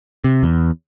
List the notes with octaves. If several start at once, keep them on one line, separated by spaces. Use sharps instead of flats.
C3
E2